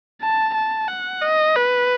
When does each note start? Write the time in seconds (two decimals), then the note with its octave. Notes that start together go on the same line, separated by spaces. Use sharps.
0.21 A5
0.54 A5
0.88 F#5
1.21 D#5
1.56 B4